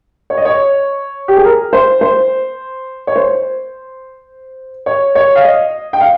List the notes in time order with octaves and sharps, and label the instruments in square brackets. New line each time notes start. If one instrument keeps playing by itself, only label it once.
[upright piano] C#5
D#5
C#5
G4
G#4
A#4
C5
C5
C#5
C5
C#5
C#5
F5
D#5
G5
F5